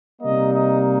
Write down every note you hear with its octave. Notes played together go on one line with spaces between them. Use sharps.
C3 G3 A#3 D#4 D#5
D#5